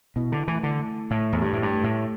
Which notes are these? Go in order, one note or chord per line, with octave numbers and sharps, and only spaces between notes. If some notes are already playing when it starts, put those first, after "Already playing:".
B2 E4
D3
E3 A3
D3
A3
A2 A3
E2
G2 G4
A2
G2
A3
A2